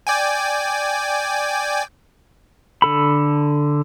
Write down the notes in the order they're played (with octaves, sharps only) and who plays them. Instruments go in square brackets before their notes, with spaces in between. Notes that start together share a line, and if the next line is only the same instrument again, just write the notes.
[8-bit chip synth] D5 G5 G#5
[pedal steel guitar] D3 A4 B5